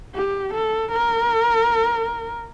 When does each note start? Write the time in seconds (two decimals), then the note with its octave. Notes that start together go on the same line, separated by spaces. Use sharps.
0.15 G4
0.54 A4
0.92 A#4